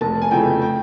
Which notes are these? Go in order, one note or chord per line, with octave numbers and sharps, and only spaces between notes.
F1 A5
G#5
F2 C#3 E3 A3 G5
G5